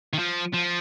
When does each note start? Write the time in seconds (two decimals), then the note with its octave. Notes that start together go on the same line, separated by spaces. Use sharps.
0.13 D#3
0.19 F3
0.54 F3